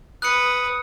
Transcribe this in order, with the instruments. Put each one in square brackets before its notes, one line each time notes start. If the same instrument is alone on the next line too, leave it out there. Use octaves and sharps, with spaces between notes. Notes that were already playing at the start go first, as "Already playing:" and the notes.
[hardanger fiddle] B4 [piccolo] D#6 [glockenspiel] F#6 C#7